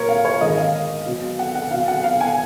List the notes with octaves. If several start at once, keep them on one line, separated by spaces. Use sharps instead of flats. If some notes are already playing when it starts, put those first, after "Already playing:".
Already playing: A#2 F#3 A#4 C#5
F5
C#5
G#2 D#3 G#3 D#5
F5
B2 F#3
F#5
F#5
B2 F#3 F5
F#5
F5
G#5